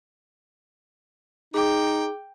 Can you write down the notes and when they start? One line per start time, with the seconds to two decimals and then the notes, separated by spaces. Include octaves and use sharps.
1.54 D#4 G#4 G5 D6